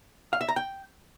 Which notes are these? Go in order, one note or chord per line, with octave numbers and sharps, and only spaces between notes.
F5
E5
A#5
G5